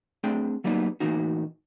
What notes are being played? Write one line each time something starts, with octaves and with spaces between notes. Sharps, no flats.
A3 C4 D4 G#4 G5
F#3 G3 A#3 B3 D#4
A2 E3 G3 A#3 D#4 F#4